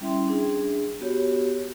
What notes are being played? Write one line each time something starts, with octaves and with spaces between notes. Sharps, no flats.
G3 C#4 E4 E5 G5 C6
D4 G#4
B3 F#4 G4 C#5